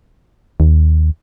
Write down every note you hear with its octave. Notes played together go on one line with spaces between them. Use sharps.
D#2